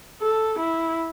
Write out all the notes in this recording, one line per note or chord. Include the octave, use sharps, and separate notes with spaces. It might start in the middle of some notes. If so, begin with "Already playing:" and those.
A4
E4